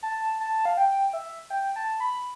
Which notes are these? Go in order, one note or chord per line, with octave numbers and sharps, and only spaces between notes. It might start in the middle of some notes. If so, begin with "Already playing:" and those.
A5
A5
F5
G5
E5
G5
A5
B5